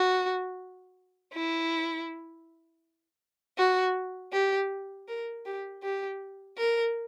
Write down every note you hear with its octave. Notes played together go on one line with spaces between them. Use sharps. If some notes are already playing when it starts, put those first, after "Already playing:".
Already playing: F#4
E4
F#4
G4
A#4
G4
G4
A#4